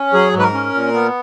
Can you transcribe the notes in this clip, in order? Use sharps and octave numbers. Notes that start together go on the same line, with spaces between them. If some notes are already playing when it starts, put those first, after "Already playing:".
Already playing: C#4
F#3 G#4
G#2
B4
A#4
C#4
A#2
B3